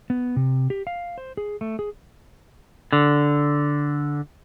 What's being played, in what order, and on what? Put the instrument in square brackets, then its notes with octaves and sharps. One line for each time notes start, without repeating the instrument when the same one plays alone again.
[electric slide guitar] B3
C3
G4
F5
C5
G#4
A3
G#4
[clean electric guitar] D3